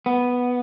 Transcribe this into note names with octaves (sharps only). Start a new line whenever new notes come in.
B3